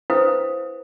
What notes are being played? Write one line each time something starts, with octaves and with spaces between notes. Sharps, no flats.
E4 B4 C5 F5 G5 D#6